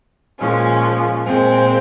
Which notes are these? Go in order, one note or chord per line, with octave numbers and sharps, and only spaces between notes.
A#2 F3 G#3 C#4
A#2 G#3 C4